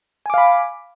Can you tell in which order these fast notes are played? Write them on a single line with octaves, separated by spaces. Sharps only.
G#5 D6 F5 B5